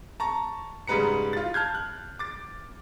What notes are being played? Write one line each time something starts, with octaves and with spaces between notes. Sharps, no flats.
A5 A#5 C#6
G#2 C#3 G3 B4 A#5 C#7
F4 A6
A5 F6 G6 G#6
F#6
D6 A6